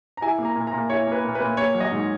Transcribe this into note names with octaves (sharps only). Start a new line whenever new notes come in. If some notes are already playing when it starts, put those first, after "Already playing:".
A#5
E4 G#5
A#3
A#5
A#2
A#5
A#2
E4 C#5
A#3 B4
A#2
A#2 B4
A#3 C#5
F#3
D#5
G#2